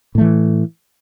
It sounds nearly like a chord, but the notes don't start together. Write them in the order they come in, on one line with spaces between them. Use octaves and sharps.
A2 A3 E3